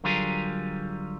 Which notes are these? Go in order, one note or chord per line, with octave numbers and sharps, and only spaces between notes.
D3 F#3 G3 F4 G#4 A#4